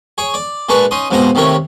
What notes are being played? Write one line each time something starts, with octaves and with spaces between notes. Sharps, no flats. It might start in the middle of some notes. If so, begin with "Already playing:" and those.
G#4 C#5
D5
A#2 G#3 D4 B4 A5 C#6
C#4 D#4 C6 D#6
F2 G#2 B2 D#4 C5 A#5
D#2 C3 A3 A#4 C#5